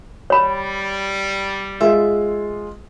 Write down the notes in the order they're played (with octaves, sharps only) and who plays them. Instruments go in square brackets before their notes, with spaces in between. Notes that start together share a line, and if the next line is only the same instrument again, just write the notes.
[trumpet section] G3 [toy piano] C#5 B5
[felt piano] G#3 F4 G#4 [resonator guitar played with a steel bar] E5